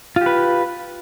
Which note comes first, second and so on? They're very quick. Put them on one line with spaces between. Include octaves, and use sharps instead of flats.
F4 G4 B4